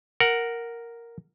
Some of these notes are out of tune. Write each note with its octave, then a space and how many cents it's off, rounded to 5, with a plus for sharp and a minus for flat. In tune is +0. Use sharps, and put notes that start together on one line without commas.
A#4 +0 F#5 +0